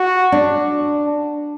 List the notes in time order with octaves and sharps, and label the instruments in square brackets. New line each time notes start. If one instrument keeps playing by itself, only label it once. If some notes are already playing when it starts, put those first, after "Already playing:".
Already playing: [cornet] F#4
[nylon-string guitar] D4